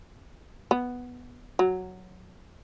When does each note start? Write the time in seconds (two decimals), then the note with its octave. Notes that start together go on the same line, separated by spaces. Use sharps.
0.71 B3
1.59 F#3